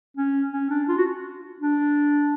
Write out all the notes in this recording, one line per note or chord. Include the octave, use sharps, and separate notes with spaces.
C#4
C#4
D4
F4
F#4
D4